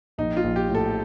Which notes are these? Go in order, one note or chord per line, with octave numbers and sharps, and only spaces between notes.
A#1 D#4
F4
A#1
G4
A2
A4